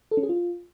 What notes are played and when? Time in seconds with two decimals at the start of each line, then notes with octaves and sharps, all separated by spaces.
0.11 A4
0.17 C#4
0.23 G#4
0.29 F4